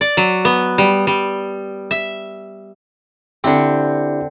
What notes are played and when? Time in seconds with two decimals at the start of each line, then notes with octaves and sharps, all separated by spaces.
0.01 D5
0.17 F#3
0.45 B3
0.78 G3
1.07 G3
1.91 E5
3.44 D3 C4 D4 E4 G4